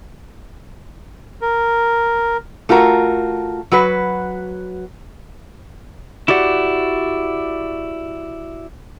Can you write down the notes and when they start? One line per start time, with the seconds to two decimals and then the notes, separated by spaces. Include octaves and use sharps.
1.41 A#4
2.69 A3 F4 F#4 A#4
3.72 F#3 F#4 B4
6.28 E4 F#4 G4 D5 F5 F#5